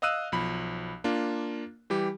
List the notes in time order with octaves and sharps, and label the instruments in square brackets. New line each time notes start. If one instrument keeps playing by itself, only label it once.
[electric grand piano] D#5 F5 D#6 E6 F#6 D#7
B1 F3 B5
A#3 D4 F4
E3 G3 G4